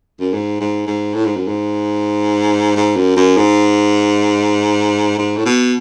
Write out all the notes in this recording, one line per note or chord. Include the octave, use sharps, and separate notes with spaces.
F#2
G#2
G#2
G#2
A2
G#2
F#2
G#2
G#2
F#2
F#2
G#2
G#2
A2
B2